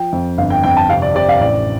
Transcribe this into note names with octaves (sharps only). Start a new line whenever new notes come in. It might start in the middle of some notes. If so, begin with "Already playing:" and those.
Already playing: F3 G5
F2
G1 F5
G5
F2 G5
A5
C3 F5
D5
C3 D5
F5
A1 D5